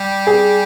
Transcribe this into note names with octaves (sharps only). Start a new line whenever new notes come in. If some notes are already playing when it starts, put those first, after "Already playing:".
Already playing: G3 G4
G#4